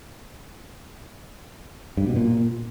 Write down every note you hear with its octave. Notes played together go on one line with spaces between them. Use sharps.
G2
B2
A#2